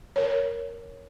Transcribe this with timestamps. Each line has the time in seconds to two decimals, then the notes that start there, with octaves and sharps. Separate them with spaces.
0.16 A#4 C#5